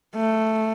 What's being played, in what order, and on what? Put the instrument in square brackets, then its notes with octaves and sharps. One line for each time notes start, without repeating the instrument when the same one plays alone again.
[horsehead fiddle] A3